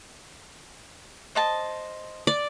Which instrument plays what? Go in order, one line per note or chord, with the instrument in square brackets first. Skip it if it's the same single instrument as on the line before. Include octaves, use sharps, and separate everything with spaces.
[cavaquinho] C5 D#5 A5
[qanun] D5